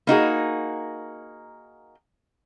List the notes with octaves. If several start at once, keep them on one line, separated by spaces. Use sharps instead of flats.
A#3 D#4 F#4 G#4